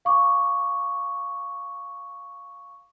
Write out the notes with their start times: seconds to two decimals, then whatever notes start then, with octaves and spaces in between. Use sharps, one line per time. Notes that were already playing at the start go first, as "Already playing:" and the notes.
0.05 F5 C#6 D6